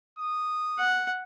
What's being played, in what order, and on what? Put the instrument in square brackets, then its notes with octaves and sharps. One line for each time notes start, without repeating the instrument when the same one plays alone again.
[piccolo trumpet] D#6
[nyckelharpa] F#5